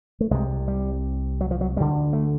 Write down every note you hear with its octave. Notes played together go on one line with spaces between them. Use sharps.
A3
C2 C3 G#3
G3
F#3
F3
F#3
D2 D3 G3
A3